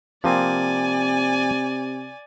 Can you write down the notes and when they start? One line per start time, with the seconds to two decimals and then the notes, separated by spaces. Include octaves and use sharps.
0.24 C3 F3 A#3 C4 D5 G#5